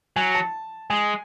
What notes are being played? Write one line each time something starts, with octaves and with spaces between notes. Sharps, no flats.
F#3 G#5
A5
G#3 G#5